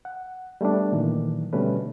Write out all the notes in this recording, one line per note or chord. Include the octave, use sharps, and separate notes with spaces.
F#5
G3 A3 B3 D4
A#2 D#3 E3 F#3
B2 D3 G3 A3 C#4 B4